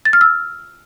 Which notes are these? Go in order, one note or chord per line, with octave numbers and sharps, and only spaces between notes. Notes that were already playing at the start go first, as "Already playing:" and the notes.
A6
F6
E6